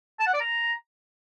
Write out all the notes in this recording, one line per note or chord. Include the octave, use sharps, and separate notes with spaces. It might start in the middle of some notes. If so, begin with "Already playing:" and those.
A5
F#5
D5
A#5